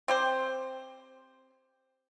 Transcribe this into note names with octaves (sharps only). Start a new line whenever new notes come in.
C4 G4 C5